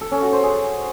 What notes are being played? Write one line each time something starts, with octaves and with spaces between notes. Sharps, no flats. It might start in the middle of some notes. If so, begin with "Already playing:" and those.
A4
C#4
F#4
C5
G#4